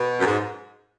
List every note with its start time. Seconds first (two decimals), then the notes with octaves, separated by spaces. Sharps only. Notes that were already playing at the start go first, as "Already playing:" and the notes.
Already playing: B2
0.20 F#2
0.26 G#2